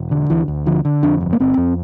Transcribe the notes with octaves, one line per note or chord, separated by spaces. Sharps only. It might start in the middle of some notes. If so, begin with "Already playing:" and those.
Already playing: E1
D3
D2 E3
D2
D3 F3
D3
F2 D4
G1
A#3
G1 C4
F2